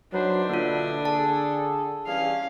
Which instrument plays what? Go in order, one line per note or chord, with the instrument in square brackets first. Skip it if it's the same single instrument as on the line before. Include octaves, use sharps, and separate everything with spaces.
[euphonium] F#3 [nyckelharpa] D4 [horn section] D#4 B4 C5
[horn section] B2 B3 E4 [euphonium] D3 [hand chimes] A#3 F4
[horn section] G#4 A4 [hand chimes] A5
[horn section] E3 G3 G#4 [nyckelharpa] C#4 F5